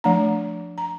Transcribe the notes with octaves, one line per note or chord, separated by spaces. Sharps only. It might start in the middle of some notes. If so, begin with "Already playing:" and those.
F3 A3 D4 A#5
A#5